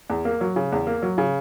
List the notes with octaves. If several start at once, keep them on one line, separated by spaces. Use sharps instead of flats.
E2
A#3
F#3
C#3
E2
A#3
F#3
C#3